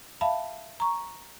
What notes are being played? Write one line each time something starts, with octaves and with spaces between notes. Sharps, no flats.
E5 F5 A5 B5
A#5 C#6